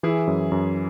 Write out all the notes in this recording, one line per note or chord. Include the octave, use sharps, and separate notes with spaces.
E3 E4 G#4
F#2
F#2